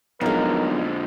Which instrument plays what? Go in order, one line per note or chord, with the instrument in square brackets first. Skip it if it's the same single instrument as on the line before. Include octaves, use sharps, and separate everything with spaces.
[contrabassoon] B1 [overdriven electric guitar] F2 D3 [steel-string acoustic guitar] F3 G#3 [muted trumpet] A#4